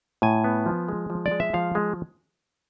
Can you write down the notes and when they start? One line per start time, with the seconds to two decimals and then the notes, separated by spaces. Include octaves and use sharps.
0.22 A2 G#5
0.44 B3
0.66 F3
0.88 G#3
1.10 F3
1.26 D5
1.31 G#3
1.40 E5
1.54 F3 F5
1.75 G#3